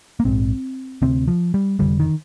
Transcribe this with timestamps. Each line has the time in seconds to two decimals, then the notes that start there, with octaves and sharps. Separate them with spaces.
0.20 A#3
0.25 A#1 G#2 C4
1.02 D2 C3 C4
1.28 F3
1.54 G3
1.79 F1 D#2 D3 G3
2.00 D#3